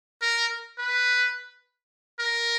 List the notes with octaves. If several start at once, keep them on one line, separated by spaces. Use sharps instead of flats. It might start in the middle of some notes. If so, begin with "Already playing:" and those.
A#4
B4
A#4